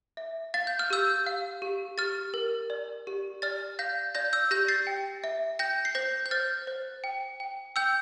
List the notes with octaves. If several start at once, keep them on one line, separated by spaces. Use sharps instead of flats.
E5
F5 A6
G6
F6
G4 E6 G6
F5
G4
G4 F6 A6
A#4
D5
G4
D5 F6 A6
F5 G6 A#6
D5 G6 A#6
E6 G6
G4 G6 A#6
A6 C7
G5
E5
G5 G6 A#6
C7
C5 G6 A#6
G6
C5 F6 A6
C5
G5
G5
G5 E6 G6